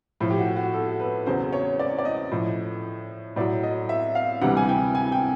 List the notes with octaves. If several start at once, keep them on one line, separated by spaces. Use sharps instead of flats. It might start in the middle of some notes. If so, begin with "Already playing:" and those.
A2 F3 F4
G4
F#4
F#4
A4
B4
E2 C#3 F#3 C5
C#5
D5
D5
D#5
A2 F3
A2 F#3 D5
D#5
E5
F5
D2 C3 E3 G3 F#5
G#5
G5
G#5
G5